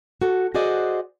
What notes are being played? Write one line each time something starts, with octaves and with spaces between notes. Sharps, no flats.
F#4 A4
F#4 G#4 C5 D5 D#5 F#5